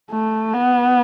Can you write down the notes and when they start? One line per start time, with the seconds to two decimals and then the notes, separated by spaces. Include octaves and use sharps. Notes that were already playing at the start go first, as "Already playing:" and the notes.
0.11 A3
0.54 B3